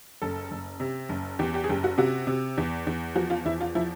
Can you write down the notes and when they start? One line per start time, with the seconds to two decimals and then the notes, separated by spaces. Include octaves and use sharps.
0.22 F#1 A4
0.51 F#1
0.80 C3
1.09 F#1
1.39 E2 G4
1.54 G4
1.64 G#4
1.69 F#1 G4
1.84 F#4
1.98 C3 F#4
2.27 C3
2.58 E2
2.87 E2
3.15 F3 F#4
3.30 F4
3.45 E2 E4
3.61 F4
3.75 F3 E4